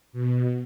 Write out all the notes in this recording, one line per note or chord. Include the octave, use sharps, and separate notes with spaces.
B2